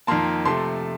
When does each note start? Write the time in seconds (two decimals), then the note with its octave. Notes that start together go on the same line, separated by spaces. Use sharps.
0.07 F2 D#3 A#3 A5 C6
0.45 C3 F3 A3 A5 C6